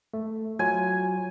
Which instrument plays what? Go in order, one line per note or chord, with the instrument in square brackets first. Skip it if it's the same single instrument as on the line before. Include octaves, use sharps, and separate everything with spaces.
[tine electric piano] A3
[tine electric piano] F#3 F4 [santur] G#5